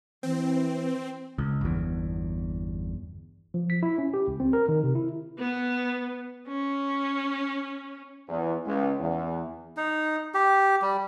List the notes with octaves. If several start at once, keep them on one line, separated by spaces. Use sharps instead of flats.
E3 C4
C#2
G1 E2
F3
B6
E4
C#4
G4
C#2
C4
A#4
D#3
C3
E4
B3
C#4
E2
C#2
E2
D#4
G4
G3